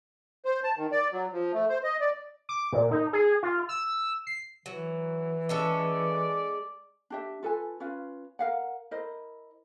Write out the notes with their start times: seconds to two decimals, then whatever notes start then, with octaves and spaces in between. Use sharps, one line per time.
0.45 C5
0.64 A5
0.77 D#3
0.92 D5
1.12 F#3
1.32 F3
1.53 A3
1.69 C5
1.84 D#5
2.01 D5
2.49 D6
2.72 A#2
2.92 D#4
3.13 G#4
3.43 F4
3.69 E6
4.27 C7
4.66 E3 F#3
5.49 G#3 C#4 A4 D5
7.10 D4 G4 E5
7.43 F4 A4 B4 G#5
7.80 C#4 F4 B4 F5
8.39 A#4 F5 F#5
8.91 E4 A#4 C5 D#5